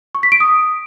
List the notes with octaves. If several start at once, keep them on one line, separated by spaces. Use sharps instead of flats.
C#6
B6
D7
D#6